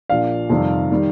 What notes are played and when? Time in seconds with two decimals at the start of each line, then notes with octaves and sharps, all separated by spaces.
0.09 A#1 A#2 F3 D5 F5
0.50 F2 C3 D#3 G3
0.92 D#3 G3